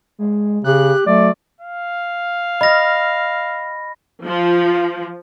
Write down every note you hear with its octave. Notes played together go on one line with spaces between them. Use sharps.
G#3
C#3 G4 F#6
F#3 A3 D5
F5
D#5 B5 D#6 F6 A#6
F3